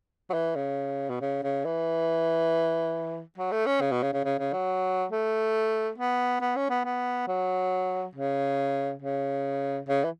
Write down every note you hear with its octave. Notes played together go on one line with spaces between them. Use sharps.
F#3
E3
C#3
B2
C#3
C#3
E3
F#3
A3
C#4
C#3
B2
C#3
C#3
C#3
C#3
F#3
A3
B3
B3
C#4
B3
B3
F#3
C#3
C#3
C#3
E3